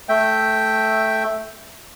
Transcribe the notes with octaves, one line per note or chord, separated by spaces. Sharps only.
A3 E5 G5